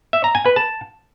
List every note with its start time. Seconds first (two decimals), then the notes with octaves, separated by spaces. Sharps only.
0.13 E5
0.24 A#5
0.35 G#5
0.46 B4
0.56 A5